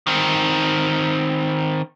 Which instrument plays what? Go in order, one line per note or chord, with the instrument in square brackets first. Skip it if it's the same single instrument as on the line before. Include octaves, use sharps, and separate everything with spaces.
[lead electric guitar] D#3 C4